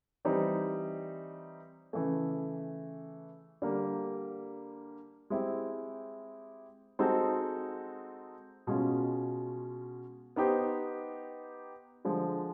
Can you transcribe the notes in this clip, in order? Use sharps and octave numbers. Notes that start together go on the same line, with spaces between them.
E3 G3 C4 D#4
C#3 E3 A3
D3 G3 A#3
G#3 C4 E4 G4
G#3 C4 D#4 F#4 A4
B2 G#3 C#4 F4
B3 D#4 G4 C5
D3 F3 G#3